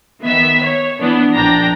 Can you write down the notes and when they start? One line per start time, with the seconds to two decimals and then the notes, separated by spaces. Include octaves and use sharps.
0.22 D#3 B3 E5 B6
0.63 C#5
1.00 E3 B3 D4
1.35 A#1 D4 G5 A#5 A#6